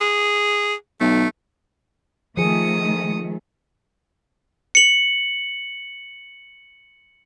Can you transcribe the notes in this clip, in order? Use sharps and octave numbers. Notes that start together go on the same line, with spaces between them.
G#4
B1 A3
D#3 F3 A3 G#4 D#6 C#7
C#7 F#7